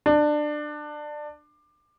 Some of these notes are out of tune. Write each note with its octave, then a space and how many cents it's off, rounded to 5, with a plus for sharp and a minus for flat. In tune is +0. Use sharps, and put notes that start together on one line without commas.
D4 +20